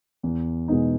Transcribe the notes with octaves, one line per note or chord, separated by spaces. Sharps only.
E2
B2 G#3 B3 D#4